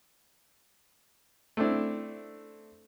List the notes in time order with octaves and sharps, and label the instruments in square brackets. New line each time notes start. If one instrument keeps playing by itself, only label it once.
[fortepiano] A3 C4 D4 E4